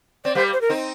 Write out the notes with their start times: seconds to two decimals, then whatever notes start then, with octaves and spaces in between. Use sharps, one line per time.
0.25 C4 D5
0.35 G3 A#3 C5
0.53 C5
0.61 A#4
0.69 C4 D#4